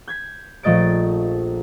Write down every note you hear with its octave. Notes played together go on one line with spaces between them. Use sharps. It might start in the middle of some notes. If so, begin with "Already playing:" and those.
G6 G#6 B6
A#1 F3 A3 D#5 A6 D7